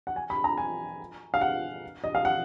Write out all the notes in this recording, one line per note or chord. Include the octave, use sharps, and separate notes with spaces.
F#5
G#5
B5
A#5
G#5
F5
F#5
D#5
F5
F#5